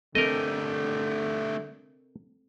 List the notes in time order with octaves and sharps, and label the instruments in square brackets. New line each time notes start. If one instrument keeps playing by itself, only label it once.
[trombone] D3 [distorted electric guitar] A3 G4 [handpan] C4 A4 [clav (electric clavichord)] A#4 D#5